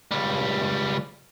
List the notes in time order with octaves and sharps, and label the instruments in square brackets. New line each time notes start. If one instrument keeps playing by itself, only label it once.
[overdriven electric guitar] C#2 G3